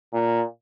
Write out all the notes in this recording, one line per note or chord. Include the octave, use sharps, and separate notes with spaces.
A#2